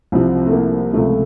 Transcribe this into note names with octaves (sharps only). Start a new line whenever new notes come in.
C2 C3 F3 C4
A3
A#3
C#2 C3 F3 A3